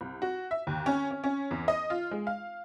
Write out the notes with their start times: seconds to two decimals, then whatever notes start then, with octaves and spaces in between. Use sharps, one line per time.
0.01 C2
0.22 F#4
0.51 E5
0.67 D#2
0.86 C#4
1.11 C#4
1.24 C#4
1.51 E2
1.68 D#5
1.90 F4
2.11 G#3
2.27 F5